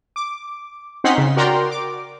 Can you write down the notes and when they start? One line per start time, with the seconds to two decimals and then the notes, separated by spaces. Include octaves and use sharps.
0.16 D6
1.04 C4 C#4 D#4 F#5 C6 B6
1.18 C#3
1.37 F#4 A#4 D5 G5 A#5 C6
1.71 D6